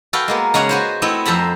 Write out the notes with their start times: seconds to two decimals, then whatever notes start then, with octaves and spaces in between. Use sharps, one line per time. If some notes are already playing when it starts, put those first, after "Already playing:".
0.13 F#4 A4 B4 F5 G5
0.28 G#3 A#3 B3
0.54 C#3 G#3 C#4 G#4 F#5 A#5
0.69 F#4 B4 C5
1.02 A3 B3 C4 E4 D#5
1.26 F2 A4 C5 A#5 B5